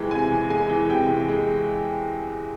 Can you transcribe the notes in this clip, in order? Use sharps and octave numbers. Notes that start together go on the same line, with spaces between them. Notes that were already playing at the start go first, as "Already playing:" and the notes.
Already playing: E2 C3 E3 G#3
C3 G#5
E2
G#3 G#5
E3
C3 G5
E2
G#3